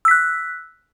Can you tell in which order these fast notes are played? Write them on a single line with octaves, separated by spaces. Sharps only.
E6 B6 F#6